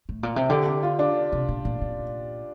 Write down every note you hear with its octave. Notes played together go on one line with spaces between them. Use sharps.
A2
A#2
C3
D3 G4
G4
F4
D4
C3
A#2
A#2
A#2